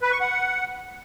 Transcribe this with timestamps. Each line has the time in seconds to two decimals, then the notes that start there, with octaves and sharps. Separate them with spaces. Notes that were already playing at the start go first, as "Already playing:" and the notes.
0.02 B4
0.11 C#6
0.21 F#5